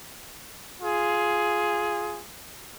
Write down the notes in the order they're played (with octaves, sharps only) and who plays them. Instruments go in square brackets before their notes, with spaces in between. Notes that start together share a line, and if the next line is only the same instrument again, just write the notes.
[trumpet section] F4 G#4